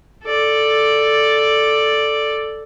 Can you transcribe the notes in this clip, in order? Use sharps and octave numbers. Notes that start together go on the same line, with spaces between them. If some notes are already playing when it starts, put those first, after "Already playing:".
A4 D5